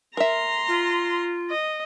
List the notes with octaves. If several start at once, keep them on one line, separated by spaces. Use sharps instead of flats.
A#4 E5 A#5 C6
F4
D#5